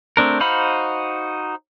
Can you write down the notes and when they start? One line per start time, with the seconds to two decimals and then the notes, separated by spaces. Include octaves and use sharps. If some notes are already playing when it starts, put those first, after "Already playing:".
0.17 A3 C4 D4 A#4
0.40 D#4 F#4 C5 F5 B5